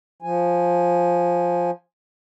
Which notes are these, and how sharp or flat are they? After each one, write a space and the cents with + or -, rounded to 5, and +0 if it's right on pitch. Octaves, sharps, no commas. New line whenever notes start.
F3 +5 G#5 +0